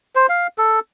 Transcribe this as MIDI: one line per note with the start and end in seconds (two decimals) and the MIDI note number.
0.15 0.27 72
0.29 0.47 77
0.58 0.79 69